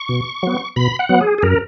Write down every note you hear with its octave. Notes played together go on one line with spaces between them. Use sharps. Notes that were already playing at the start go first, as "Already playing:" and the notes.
Already playing: C#6
B2
F#3 B3
B2 B5
F#5
F#3 B3
G#4
G#4
F#2 A#4